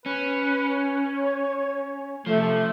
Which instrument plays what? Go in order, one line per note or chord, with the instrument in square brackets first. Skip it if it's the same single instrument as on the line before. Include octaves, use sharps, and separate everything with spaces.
[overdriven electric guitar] C#4 [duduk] B4
[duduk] C#5
[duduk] C3 [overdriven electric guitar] F3 [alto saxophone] A3